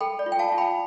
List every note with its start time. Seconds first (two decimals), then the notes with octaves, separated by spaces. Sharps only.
0.01 A4 G5 B5
0.19 D5
0.26 F4
0.32 G5
0.39 F5 A5
0.52 F4
0.58 G5 B5